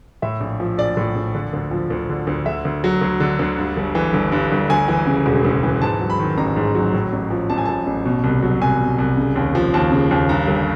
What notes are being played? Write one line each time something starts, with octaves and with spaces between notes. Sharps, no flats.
A2 E5
A#1
F3
A#1 D5
A2
A#1
D3
D2
F3
D2
D3
D2
D3 E5
D2
F#3
D2
D3
D2
G2
G1
E3
G1
G2
G1
D2 G#5
E3
C#3
E1
D2
E3
G#2 A5
F#3
B5
D#3
A1 A#5
G#2
F#3
A2
A1
F3
A1 A5
G#5
A2 A5
A1
B2
C2
F#3
C2 G#5
B2
C2
C#3
D#2
F3
D#2 A5
C#3
D#2
G2 A#5
G1